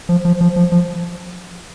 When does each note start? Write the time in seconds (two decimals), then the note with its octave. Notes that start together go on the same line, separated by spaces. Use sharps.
0.09 F3
0.25 F3
0.41 F3
0.56 F3
0.72 F3